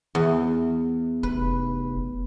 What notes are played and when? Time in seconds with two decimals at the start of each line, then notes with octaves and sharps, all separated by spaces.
0.15 E2
1.23 F1 B4